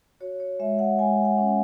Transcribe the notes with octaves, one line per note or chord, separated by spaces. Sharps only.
F#4 C#5
C#5
G#3 E5
F#5
G#3 G#5
F#5
C#4